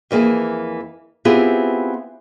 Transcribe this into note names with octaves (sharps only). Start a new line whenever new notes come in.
F2 E3 A#3 G#4
B3 C4 E4 F4 G4 G#4